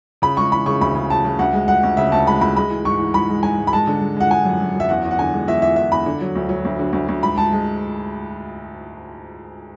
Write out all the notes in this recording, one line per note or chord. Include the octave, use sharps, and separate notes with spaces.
C#3 B5
G#3 C#6
E3 B5
C#3 C#6
D2 B5
C#3
C#3 A5
C#3
D2 F#5
G#3
G#3 F#5
D2
C#3 E5
D2 A5
G#3 B5
D2 B5
G#3 B5
E3
G#2 C#6
E3
G#2 B5
G#3
G#2 G#5
G#2
B5
G#3 A5
D3
G#3
G#3 F#5
G#3 G#5
F#2
F#2
F#2
E5
E2 F#5
E2
F#5
D3 G#5
G#3
E2 E5
E2 E5
E2 E5
E2 B5
D3
F#3
D2
F#3
D2
D3
D2
D2
G#2 B5
G#2 A5
G#3